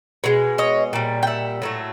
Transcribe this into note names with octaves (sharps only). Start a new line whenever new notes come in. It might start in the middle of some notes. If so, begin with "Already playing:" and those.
B2 G#3
C#5 D#5
A#2 G3
G5
E5 F#5
A2 F#3 A3